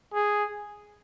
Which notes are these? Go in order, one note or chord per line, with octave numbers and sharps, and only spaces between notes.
G#4